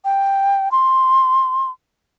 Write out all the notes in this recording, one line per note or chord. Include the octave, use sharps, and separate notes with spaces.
G5
C6